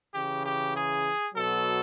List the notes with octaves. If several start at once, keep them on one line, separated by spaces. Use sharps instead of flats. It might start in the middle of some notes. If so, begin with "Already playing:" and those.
C#3 E3 G4
G4
G#4
B2 F#3 A4